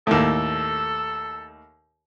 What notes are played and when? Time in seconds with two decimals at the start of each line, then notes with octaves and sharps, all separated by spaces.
0.07 D#2 A2 A4